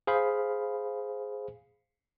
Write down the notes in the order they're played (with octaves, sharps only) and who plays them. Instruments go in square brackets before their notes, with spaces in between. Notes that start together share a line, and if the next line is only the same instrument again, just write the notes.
[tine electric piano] G#4 C5 F5 B5